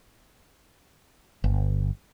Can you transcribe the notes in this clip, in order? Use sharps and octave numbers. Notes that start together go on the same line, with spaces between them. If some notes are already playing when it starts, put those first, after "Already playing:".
G1